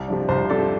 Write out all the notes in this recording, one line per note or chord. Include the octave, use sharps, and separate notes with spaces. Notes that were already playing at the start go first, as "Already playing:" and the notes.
Already playing: C2
C3 F3 D4
C2 C5
C3 F3 D4 A4 D5